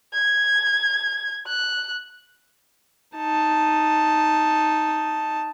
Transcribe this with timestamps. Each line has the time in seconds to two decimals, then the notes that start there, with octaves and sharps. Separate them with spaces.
0.13 G#6
1.48 F#6
3.17 D#4 A5